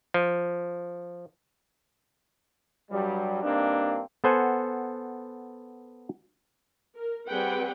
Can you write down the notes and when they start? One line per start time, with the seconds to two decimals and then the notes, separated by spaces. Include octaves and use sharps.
0.14 F3
2.91 G2 F#3 G3
3.42 G2 A#3 C4 D4 D#4
4.24 B3 A4 C5 F#5 G#5
6.96 A#4
7.29 G3 C4 G#4 B4 F#5 G5